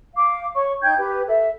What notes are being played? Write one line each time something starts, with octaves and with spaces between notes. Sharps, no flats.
F5 D6
C#5 C#6
D#4 G5 G6 G#6
G4 B4
A4 E5